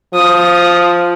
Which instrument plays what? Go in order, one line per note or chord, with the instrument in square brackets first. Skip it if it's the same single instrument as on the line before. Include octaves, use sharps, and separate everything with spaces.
[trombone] F3 [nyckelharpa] D#6